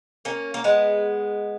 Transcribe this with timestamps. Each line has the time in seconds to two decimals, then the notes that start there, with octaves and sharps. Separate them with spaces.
0.25 A#3 C#4
0.54 A#3
0.64 G#3 B3